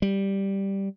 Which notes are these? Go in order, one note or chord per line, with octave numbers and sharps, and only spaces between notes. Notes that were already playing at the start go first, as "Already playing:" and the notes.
G3